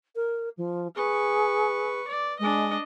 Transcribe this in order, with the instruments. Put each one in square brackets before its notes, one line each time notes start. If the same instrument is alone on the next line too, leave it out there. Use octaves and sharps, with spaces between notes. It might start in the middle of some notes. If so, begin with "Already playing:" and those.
[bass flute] A#4
F3
[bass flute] G#4 [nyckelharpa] B4 C#6
[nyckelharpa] D5
[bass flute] G#3 [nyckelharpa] D4 D#5